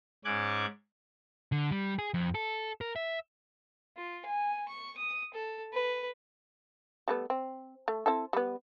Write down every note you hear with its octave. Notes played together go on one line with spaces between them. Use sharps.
G#2 C#4 D6 F#6 G#6
D3
G3
G#4
F2
A4
A#4
E5
F4
G#5
C#6
D#6
A4
B4
G3 A3 B3
C4
A3
C4 E4 A4
G3 B3